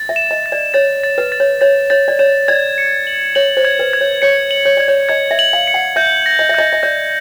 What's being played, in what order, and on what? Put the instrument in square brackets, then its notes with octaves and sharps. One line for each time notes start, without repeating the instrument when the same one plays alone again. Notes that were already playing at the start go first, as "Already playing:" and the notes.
Already playing: [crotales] A6
[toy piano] E5
[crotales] E7
[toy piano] D#5
[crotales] A6
[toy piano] D5
[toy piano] C#5 [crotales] A6
[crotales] A6
[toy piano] B4
[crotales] A6
[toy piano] C#5
[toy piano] C#5 [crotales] A6
[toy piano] C#5 [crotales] A6
[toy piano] D5
[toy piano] C#5 [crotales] E7
[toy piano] D5 [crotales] G#6
[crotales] C#7
F#7
[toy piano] C#5 [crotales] F#7
[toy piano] C5
[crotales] G#6
[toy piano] B4
[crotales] G#6
[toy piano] C#5
[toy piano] C#5 [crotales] C#7
[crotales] F#7
[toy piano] C#5
[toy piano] D5 [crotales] G#6
[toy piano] C#5
[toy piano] D#5 [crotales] G#6
[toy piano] E5
[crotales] F#7
[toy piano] F5
[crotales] C#7
[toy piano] F#5
[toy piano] E5 [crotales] G6
[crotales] A#6
[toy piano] D#5
E5
[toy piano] D#5 [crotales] G6
[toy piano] D#5
[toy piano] D5 [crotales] G6